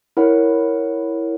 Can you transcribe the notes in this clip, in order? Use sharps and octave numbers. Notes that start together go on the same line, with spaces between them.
E4 A#4 C#5 F#5